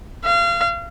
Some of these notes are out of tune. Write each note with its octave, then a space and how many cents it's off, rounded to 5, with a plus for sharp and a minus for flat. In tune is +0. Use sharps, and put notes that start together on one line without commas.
F5 -30